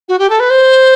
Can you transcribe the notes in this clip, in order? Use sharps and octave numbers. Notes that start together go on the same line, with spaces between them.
F#4
G4
A4
B4
C5